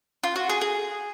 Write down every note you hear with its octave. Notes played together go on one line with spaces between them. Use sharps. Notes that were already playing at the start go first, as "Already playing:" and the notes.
F4
F#4
G#4
G#4